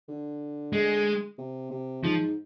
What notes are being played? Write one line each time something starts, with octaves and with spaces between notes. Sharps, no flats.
D3
G#3
C3
C3
G#2 F3